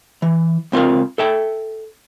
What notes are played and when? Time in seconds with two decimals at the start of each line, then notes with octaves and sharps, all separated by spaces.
0.22 E3
0.72 C#2 C4 F4 A#4 F5
1.18 A4 E5 G5